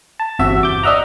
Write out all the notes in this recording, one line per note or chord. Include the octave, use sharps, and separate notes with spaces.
A5
G1 E2 C3 F#4 E5
D6 G6
D4 D#5 E5 F#5 A#5